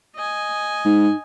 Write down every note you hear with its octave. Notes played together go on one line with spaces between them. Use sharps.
D#5 G#5
G#2 D#4